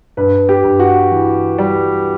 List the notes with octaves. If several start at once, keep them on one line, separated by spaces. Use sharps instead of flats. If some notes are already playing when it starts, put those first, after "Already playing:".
G2 B4
G4
G2
F#4
E3
G3